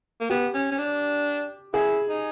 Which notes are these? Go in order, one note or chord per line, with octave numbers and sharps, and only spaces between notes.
A#3
B3 G4
C#4
C#4
D4
E4 G#4
D#4